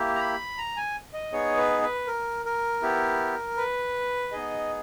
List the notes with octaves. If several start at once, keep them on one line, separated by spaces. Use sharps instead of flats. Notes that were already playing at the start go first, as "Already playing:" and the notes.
Already playing: A#3 E4 G4
A#5
B5
A#5
G#5
D#5
B3 D#4 G#4 C#5
B4
B4
A#4
A#4
B3 E4 G4
B4
B3 D#4 G#4 D#5